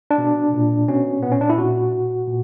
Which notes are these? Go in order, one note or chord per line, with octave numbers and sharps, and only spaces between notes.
D4
B2
A#2
B2 C#4
A#2 B3
C#4
D4
E4
A#2 F#4
A#2
A#2